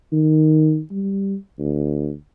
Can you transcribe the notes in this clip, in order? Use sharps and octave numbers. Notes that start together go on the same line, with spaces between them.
D#3
G3
D2